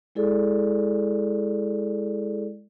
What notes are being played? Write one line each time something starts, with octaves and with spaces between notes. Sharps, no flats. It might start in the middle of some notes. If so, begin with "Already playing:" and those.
G#3 E4 G#4 A4 D5